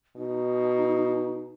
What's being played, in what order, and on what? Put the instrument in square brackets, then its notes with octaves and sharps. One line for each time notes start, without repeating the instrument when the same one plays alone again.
[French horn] B2 [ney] D#4